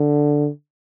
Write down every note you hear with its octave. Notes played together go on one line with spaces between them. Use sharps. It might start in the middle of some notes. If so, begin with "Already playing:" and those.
Already playing: D3